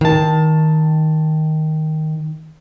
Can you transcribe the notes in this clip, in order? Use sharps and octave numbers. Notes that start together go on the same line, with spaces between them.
D#3 A5